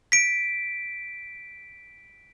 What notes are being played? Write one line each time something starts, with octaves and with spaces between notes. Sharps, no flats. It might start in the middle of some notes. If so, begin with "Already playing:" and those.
B6 D7